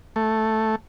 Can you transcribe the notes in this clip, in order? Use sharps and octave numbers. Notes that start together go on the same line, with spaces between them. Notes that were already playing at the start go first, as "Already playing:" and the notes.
A3